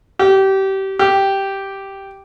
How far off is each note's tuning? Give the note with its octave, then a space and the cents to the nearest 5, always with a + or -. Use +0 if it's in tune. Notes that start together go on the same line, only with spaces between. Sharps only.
G4 -25
G4 -5